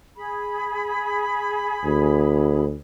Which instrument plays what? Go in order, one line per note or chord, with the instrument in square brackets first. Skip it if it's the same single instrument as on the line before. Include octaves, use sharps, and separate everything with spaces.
[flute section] G#4 B5
[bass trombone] D2